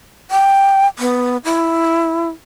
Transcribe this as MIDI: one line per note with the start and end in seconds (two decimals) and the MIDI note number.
0.31 0.87 79
0.99 1.37 59
1.45 2.29 64